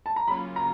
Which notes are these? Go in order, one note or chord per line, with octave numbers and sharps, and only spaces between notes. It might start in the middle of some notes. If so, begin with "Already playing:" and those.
A5
A#5
C#3 F#3 A#3 C#4 F4 B5
A#5